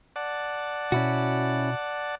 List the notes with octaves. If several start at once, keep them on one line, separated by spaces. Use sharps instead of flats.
D5 F#5 A5
B2 C#4 E4 F#4